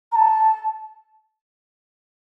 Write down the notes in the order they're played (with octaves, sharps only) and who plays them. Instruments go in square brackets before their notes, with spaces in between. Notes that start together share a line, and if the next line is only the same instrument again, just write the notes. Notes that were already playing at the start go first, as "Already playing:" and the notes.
[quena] A#5
A5